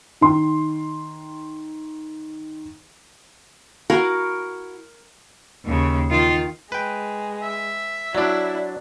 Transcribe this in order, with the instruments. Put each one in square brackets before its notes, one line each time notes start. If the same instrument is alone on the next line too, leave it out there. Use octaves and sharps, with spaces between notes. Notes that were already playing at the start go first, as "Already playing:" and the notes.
[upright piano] D#3 C6
[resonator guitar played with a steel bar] E4 F#4 F5 [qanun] A#4
[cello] D#2 C#3
D#3 F4
[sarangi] G#3 [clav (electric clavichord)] B4 G5
[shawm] E5
[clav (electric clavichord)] F#3 D4 [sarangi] E4 [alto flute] D5